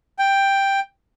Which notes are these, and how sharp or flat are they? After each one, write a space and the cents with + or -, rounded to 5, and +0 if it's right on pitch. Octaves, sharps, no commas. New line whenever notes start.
G5 +5